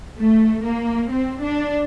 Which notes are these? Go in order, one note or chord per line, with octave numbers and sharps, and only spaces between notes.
A3
A#3
C4
D4